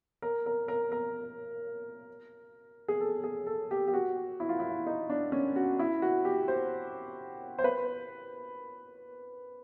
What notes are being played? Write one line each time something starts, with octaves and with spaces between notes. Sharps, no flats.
A#4
A#4
A#4
A#4
G#4
A4
G#4
A4
G4
G4
F#4
E4
F4
E4
D#4
D4
C#4
F#4
E4
F#4
G4
C5
C5
B4